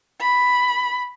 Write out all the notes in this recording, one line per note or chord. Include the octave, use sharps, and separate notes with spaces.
B5